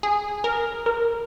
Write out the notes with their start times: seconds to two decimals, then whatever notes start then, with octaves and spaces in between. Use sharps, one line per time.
0.03 G#4
0.44 A#4
0.86 A#4